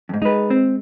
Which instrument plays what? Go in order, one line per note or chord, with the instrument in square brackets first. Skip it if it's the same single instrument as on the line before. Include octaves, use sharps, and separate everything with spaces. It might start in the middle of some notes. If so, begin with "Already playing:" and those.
[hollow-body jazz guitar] F2 G#2
[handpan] G#3 [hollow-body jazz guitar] D#4 B4
[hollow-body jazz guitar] C4